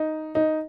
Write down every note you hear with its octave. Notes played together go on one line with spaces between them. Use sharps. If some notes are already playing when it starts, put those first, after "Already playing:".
Already playing: D#4
D#4